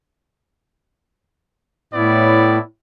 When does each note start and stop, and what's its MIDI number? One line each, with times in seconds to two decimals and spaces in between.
1.94 2.58 45
1.94 2.62 59
1.94 2.62 64
1.94 2.62 74